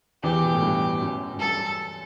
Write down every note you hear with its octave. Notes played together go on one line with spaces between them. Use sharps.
E2 E3 G4
B2
A2
G2
F#2
F#2
G2 A4